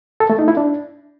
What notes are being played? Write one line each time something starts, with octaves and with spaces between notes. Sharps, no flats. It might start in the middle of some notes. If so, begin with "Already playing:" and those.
A4
A3
D#4
E4
D4